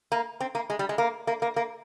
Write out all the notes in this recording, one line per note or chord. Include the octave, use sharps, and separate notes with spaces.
A#3
C4
A#3
G#3
G3
G#3
A#3
A#3
A#3
A#3